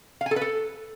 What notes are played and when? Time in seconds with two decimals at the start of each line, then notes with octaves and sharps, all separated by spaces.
0.21 F5
0.26 G#5
0.31 A4
0.36 B4
0.41 A4